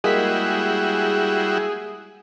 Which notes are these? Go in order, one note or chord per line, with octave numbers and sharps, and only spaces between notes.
G3 G#3 A#3 E4 F#4 G#4 B6